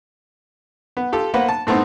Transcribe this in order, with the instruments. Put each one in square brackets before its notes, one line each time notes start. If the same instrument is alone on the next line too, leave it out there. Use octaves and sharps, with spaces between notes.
[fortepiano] B3
F4 G4 A4
A#3 B3 B4 C5 F#5
A5
A2 A3 B3 C4 D#4